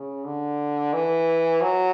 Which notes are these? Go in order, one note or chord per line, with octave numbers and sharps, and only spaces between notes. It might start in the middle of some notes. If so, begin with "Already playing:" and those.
Already playing: C#3
D3
E3
F#3